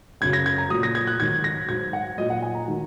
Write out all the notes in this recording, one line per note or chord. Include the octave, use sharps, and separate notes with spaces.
F#2 C#3 F#3 G#6
A#6
G#6
A#5
A#2 F#3 D#6
A#6
G#6
F#6
G#2 D#3 F#3 G#6
A#6
G#2 F#3 G#6
F#5
A#2 F#3 D#5
F#5
G#5
A#5
D#3 F#3